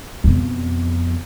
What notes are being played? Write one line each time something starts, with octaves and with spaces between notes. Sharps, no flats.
F2 B2